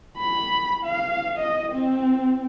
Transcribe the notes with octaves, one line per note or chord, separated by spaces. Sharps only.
B5
F5
D#5
C4